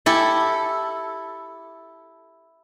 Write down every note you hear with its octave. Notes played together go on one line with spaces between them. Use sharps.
E4 G4 A4